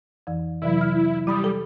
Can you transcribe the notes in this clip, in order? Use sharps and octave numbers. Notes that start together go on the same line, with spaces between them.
F2 E3
C3 E3 F#3 E4
F6
G3 E4 B5 D#6
A4